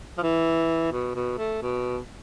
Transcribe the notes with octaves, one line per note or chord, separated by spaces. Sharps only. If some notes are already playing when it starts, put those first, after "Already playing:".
F3
E3
B2
B2
A3
B2